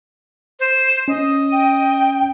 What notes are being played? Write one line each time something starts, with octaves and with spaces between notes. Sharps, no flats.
C5
C#4 D#5
G5